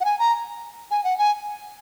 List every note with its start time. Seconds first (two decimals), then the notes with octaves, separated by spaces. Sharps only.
0.01 F#5
0.05 G#5
0.19 A#5
0.91 G#5
1.04 F#5
1.18 G#5